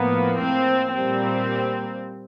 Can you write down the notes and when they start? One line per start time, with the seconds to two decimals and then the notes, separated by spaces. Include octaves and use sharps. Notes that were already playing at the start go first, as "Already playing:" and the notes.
Already playing: A2 F3 A#3 B3
0.40 C4
0.95 A#2 G3 A#3 C4